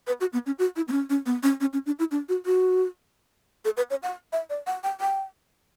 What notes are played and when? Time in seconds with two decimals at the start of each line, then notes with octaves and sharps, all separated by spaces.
0.07 B4
0.21 F#4
0.33 B3
0.46 C#4
0.59 F#4
0.76 E4
0.88 B3
0.92 C#4
1.10 C#4
1.26 B3
1.43 C#4
1.61 C#4
1.73 C#4
1.86 D4
1.99 E4
2.11 D4
2.29 F#4
2.46 F#4
3.65 A4
3.77 B4
3.90 C#5
4.03 F#5
4.33 E5
4.50 D5
4.67 F#5
4.84 G5
5.01 G5